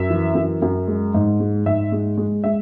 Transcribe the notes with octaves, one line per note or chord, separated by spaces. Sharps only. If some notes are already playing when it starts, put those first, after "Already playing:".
Already playing: F#2 E5
E3
F#2
F#2
G#3
G#2
G#3
G#2 E5
G#3
G#3
G#3 E5